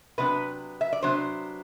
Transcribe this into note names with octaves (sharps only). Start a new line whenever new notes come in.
C3 F#3 B3 D4 B4
E5
D5
C3 F#3 B3 D4 C5